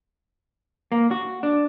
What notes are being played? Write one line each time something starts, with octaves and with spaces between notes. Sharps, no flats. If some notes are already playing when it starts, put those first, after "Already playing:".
A#3
F#4
D4